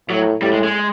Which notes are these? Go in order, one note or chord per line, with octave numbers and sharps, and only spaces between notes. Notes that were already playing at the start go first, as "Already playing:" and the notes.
A2 F#3
A2 G3
G#3
G#3